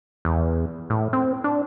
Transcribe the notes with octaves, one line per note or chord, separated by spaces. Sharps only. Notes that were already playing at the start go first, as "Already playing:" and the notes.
E2
A2
C4
D4